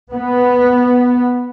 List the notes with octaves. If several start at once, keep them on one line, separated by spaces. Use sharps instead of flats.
B3